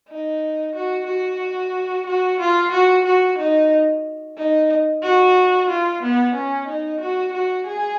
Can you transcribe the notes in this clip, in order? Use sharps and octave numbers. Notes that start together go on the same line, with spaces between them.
D#4
F#4
F#4
F#4
F4
F#4
F#4
D#4
D#4
F#4
F4
B3
C#4
D#4
F#4
F#4
G#4